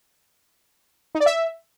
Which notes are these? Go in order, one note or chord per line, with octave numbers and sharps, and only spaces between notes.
D#4
D5
E5